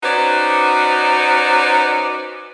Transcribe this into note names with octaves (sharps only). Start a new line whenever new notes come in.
C#4 D#4 F#4 B4 C5 D5